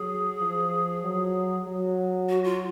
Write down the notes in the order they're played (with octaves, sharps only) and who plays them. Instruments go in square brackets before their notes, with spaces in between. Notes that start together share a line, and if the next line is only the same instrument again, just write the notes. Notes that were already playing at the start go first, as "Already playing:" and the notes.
Already playing: [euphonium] F#3 [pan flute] G#4
[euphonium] F3
F#3
F#3
[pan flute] F#4
F4